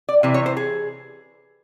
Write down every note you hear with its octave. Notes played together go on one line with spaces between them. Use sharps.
D5
C3 E3
C#5
C5
G#4